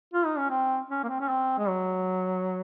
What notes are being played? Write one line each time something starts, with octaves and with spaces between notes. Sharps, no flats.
F4
D#4
C#4
C4
C#4
A#3
C4
C#4
C4
G#3
F#3